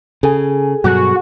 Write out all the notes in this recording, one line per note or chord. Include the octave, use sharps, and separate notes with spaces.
C#3 G#4 A4 G#5
G2 B2 F#3 F#4